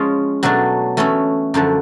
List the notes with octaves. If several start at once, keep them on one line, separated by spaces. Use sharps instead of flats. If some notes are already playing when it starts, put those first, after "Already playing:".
Already playing: F3 G#3 C#4 F4 G#4
B2 F#3 A3 D4
E3 A3 C#4 E4
F#2 D3 F3 A3